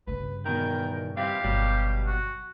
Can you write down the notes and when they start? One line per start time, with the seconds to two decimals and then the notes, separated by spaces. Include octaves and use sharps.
0.07 G2 C#3 B4
0.46 E2 B2 D#3 A#4 G5
1.17 E3 G3 C4 G4 F5
1.44 G1 B2 F#3 G3
2.06 F#4